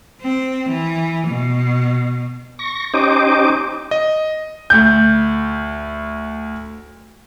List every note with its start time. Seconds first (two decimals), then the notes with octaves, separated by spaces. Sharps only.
0.22 C4
0.69 E3
1.28 B2
2.59 C#6 A#6
2.94 C#4 D#4 G4 C5 D#5 D6
3.91 D#5
4.70 D2 G6